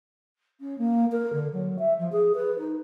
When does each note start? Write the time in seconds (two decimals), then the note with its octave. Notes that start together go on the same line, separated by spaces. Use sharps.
0.60 C#4
0.78 A#3
1.12 A#4
1.33 D3
1.53 F#3
1.79 E5
1.99 F3
2.12 G#4
2.35 B4
2.58 D#4